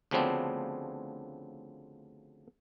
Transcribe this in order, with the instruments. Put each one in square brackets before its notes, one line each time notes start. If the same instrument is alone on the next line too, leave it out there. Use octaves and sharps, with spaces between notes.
[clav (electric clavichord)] D2 C#3 F3 B3 C4 D4